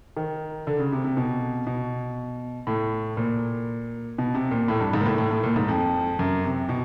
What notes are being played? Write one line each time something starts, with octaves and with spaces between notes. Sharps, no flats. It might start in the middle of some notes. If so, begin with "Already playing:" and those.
D#3
D3
C#3
C3
C3
B2
B2
A2
A#2
B2
C3
A#2
A2
G2
G#2
A#2
A2
A2
A2
A#2
G#2
F2
F#2
C3
B2